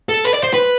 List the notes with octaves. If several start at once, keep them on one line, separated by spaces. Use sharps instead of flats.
A4
B4
D5
C5
B4